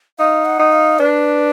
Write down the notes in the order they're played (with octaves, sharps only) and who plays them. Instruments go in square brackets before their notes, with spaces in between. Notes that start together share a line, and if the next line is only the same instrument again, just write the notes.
[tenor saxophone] D#4 [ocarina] F5
[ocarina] F#5
[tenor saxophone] D#4
[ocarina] F5
[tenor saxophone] D4 [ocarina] B4